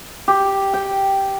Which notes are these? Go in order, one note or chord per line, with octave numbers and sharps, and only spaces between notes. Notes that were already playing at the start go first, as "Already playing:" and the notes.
G4
G5